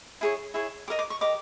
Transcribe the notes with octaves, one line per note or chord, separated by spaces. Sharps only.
E4 G#4 C#5
E4 G#4 C#5
G4 A#4 D#5 D6
D6
C#6
G4 A#4 D#5 D6